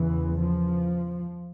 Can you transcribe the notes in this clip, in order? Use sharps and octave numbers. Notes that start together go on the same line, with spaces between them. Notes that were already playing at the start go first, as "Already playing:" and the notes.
Already playing: E2 C#3 E3
F3